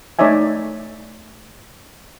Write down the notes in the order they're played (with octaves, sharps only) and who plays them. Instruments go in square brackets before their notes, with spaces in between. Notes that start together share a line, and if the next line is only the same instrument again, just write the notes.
[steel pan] A3 D#4 C#5 D5 E5 G#5